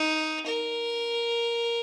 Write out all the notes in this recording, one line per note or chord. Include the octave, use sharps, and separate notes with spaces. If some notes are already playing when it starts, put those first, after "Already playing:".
Already playing: D#4
A#4